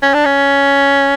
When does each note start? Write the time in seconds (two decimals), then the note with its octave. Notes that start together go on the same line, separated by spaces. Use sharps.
0.02 C#4
0.14 D4
0.25 C#4